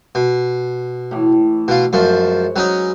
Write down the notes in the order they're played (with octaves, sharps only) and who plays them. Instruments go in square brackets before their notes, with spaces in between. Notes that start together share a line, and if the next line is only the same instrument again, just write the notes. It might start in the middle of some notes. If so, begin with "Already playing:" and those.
[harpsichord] B2
[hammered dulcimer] A2 E3
[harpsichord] B2 F4
[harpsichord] F#2 F3 [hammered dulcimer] G#3 C5 C#5
[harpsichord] F#3 C#4 D#4 [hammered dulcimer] B4